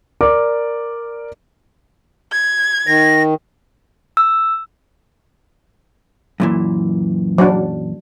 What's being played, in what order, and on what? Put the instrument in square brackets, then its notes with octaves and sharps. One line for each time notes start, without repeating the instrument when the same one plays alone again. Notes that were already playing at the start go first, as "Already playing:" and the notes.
[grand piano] A#4 D5 D6
[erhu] G#6
[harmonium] D#3 [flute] A#6
[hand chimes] E6
[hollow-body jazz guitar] F#2 A#2 E3
[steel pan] F#3 D4